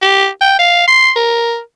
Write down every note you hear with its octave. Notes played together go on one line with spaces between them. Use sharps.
G4
G5
F5
C6
A#4